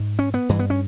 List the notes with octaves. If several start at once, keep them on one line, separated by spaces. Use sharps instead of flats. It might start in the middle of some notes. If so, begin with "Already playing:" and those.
Already playing: G#2
C#4
B3
G2 E3
B3
C#4